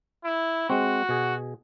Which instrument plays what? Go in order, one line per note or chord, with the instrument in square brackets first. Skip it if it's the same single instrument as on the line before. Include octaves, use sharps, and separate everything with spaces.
[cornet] E4
[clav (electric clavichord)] G#3 C4 [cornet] F#4
[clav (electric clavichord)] B2 G#4